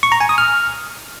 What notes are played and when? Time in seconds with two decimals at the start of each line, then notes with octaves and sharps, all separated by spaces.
0.03 C#6
0.12 A#5
0.20 G#5
0.29 D#6
0.38 F6